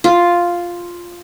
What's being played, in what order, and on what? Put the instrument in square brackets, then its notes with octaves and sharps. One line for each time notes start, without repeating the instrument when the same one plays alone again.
[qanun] F4